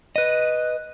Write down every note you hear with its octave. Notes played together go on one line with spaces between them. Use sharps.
B4 D#5